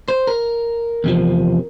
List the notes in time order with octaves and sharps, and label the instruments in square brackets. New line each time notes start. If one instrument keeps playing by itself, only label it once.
[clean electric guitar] C5
A#4
E2 C3 F3